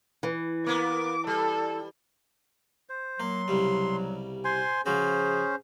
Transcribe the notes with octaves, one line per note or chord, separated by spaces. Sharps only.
E3
A#3 B3 D6
G3 A4
C5
F#3 A#3 C6
C2 C#3 G3
C5 G#5 C6
C#3 F3 C#4 F#4 G#4 C5